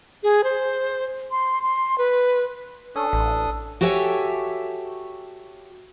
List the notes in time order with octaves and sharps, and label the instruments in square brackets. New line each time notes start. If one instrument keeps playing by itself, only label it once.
[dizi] G#4
C5
C6
C6
B4
[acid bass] C#4 [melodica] D4 A4 D#6
[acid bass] A1
[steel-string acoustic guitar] F#4 G4 A4 C#5 E5 G#5